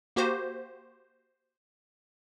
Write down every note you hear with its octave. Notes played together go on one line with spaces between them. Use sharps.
A#3 F#4 G4 C5